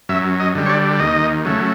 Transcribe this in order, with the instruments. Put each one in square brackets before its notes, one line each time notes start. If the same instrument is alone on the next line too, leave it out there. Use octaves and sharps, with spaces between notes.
[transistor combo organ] F#2 E5
D#5
D3 G3
C#5
D5
D#2 D#5
C#3 F#3 A3